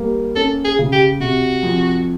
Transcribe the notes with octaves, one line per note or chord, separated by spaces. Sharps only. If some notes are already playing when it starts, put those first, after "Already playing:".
Already playing: G3 A#3
C#4 A4
G#4
C#3
G4
C3 F#4
F2